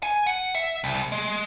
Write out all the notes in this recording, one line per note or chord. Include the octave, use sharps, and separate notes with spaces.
G#5
F#5
E5
C2
G#3